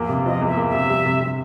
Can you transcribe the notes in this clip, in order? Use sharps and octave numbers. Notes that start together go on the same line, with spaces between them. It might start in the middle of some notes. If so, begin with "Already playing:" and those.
Already playing: E2 F3 A#3
C3
F3 D#5
E2 E5
A#3
E5
C3
G3
C3
C3